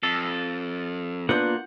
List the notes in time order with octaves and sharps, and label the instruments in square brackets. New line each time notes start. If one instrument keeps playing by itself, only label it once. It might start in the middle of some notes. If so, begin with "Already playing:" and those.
[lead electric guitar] F2 [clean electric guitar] A4
[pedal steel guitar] A#3 F4 F#6 [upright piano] B3 D4 G6 [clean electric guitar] F#5